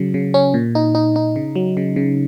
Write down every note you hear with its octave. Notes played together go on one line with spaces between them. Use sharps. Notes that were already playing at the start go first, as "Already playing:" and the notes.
Already playing: C#3 F#3
C#3
C#4
A#2
D#4
D#4
D#4
C#3
F#3
C#3
C#3